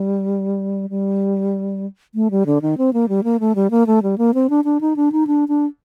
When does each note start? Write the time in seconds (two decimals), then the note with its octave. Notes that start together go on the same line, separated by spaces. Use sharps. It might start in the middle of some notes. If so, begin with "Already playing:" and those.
Already playing: G3
0.90 G3
2.15 A3
2.31 G3
2.46 D3
2.62 D#3
2.78 C4
2.93 A#3
3.09 G3
3.24 A#3
3.40 A3
3.55 G3
3.71 A#3
3.87 A3
4.03 G3
4.18 A#3
4.34 C4
4.50 D4
4.64 D4
4.81 D#4
4.96 D4
5.12 D#4
5.27 D4
5.48 D4